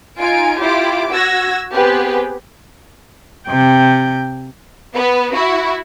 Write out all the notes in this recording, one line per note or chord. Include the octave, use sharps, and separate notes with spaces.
D#4 F4 G#5 D7
E4 F4 G4 D6
F#4 E6 G#6 A#6
B3 C4 G4 G#4 B4
C3 G5
B3
E4 F#4